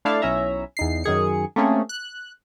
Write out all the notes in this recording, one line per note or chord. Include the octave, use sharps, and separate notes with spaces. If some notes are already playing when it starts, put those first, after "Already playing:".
A3 D4 E4 F5 A5
B1 C#4 E4 E5 A#5
E2 D#4 C7
F#2 D#3 G#4 C#7
A3 A#3 C4 C#4 G#4
F#6